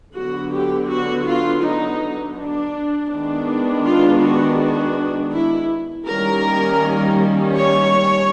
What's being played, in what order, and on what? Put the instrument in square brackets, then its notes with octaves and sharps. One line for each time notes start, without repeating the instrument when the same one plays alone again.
[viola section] D3 F#3 B3 F#4
G4
F#4
F4
D#4
D4
D#3 G#3 B3 D4
F4
F#4
F#4
E4
D#3 G3 A#3 C#4 A#4
C#5